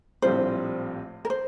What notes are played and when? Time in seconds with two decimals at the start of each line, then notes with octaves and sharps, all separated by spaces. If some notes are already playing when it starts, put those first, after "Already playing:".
0.22 A#1 A2 G3 C4 F4 C5
1.25 A#4
1.30 C5